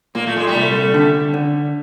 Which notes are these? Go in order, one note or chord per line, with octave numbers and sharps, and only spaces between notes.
A#2 A#3
A3
G#3
G3 A3
C2
D3
D3